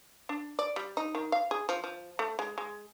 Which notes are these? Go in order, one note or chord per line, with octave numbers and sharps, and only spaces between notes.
D4
D5
G3
D#4
D#3
F5
G#4
F3
F3
A3
G#3
G#3